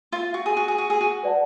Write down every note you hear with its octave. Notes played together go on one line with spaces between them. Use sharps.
F4
F#4
G#4
F#4
G#4
F#4
G#4
F#4
B4 D5 F#5 A5